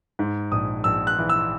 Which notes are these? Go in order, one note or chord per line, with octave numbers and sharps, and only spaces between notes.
G#2
A#1 D#6
A#1 E6
F#6
E3
E6